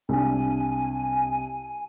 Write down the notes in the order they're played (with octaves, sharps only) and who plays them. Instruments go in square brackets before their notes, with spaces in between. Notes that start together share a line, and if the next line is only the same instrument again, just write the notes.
[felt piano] C2 D4 [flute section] G#5